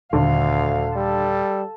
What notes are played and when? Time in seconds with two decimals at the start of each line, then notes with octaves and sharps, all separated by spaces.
0.13 D#1 D2 D3 F5
0.96 G3 A4